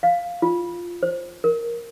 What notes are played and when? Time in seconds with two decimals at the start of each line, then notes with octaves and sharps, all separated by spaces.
0.03 F5
0.42 F4
1.03 C5
1.44 A#4